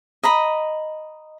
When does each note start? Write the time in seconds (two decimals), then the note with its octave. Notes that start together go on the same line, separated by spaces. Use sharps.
0.23 D#5 A#5 B5